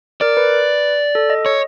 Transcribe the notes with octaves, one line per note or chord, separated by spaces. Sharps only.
A#4 D5
B4
A4
D#5
C#5